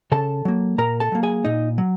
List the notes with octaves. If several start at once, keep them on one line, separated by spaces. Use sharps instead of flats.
C#3 A4 A5
F#3 A#3
A#2 A#4 A#5
A4 A5
F#3 A#3
G#4 G#5
A#2 D#4 D#5
F#3